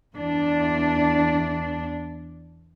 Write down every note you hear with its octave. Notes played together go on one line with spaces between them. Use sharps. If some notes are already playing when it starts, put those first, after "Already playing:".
E2 D4